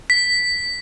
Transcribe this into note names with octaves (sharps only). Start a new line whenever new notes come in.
B6